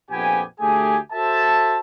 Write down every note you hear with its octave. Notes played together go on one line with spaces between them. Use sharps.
A#1 F2 B3 G4 G#5
D2 A3 G4 G#4 G#5
F#4 A4 C5 E5 A5